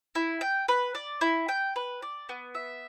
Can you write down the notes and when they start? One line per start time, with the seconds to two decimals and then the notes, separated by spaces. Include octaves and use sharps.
0.15 E4
0.41 G5
0.68 B4
0.95 D5
1.21 E4
1.49 G5
1.76 B4
2.02 D5
2.29 B3
2.55 E5